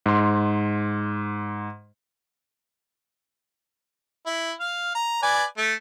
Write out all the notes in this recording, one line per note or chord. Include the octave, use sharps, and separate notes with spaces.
G#2 C6
E4
F5
A#5
B4 D5 G#5
A3